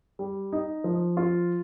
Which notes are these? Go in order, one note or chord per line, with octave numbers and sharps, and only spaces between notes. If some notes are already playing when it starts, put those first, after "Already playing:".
G3
D#4
F3
F4